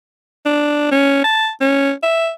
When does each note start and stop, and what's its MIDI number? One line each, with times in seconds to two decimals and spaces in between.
0.46 0.87 62
0.91 1.23 61
1.24 1.49 81
1.61 1.92 61
2.03 2.31 76